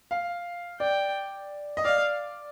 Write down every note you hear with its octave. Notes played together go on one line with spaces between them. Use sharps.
F5
D5 G5
D#5
D5 F5